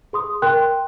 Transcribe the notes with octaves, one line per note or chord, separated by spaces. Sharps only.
G#4 C6 D#6
A#4 G5 C6 F#6